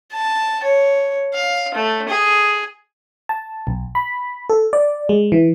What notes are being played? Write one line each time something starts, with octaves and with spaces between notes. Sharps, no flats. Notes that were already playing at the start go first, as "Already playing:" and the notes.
A5
C#5
F5
A3
G#4
A5
B1
B5
A4
D5
G#3
E3